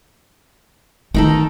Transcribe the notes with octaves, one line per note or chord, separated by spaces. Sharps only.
D#3 A3 D#4 A4